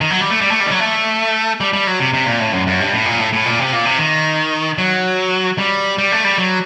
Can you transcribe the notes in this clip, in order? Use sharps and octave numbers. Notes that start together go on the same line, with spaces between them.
D#3
F#3
G3
A3
G3
A3
G3
D#3
F#3
A3
G3
G3
F#3
C3
C3
A#2
A2
F#2
F#2
G2
A2
A#2
A2
A2
A#2
C3
A#2
C3
D#3
F#3
G3
G3
A3
G3
F#3